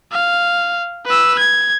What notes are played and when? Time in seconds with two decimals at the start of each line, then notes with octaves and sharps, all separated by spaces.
0.12 F5
1.06 B4 E6
1.39 G#6